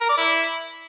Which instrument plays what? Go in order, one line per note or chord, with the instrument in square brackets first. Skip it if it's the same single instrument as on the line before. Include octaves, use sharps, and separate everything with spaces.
[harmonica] A#4
D5
E4